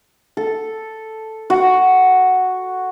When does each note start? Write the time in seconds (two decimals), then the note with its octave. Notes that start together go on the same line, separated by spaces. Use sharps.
0.37 A4
1.50 F#4